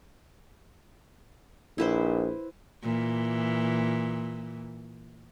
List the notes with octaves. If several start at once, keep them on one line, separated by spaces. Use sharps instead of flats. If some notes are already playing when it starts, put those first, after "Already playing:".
A#1 E4 B4 C5
A#2 E3